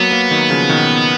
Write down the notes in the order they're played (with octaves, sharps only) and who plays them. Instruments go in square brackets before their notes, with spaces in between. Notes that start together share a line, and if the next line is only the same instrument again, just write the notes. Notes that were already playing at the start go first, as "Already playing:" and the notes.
Already playing: [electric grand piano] F#3 A#3 [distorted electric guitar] B3
[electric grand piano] F#3 A#3
D#3 F#3
C#3 F3
B2 D#3